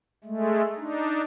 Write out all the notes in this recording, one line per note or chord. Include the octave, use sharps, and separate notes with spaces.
G#3 A3
D4 D#4